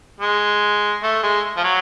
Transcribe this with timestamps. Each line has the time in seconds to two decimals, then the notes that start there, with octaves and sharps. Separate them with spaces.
0.20 G#3
1.03 A3
1.23 G#3
1.57 F3
1.64 F#3